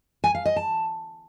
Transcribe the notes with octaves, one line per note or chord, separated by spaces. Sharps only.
G#5
F5
D#5
A5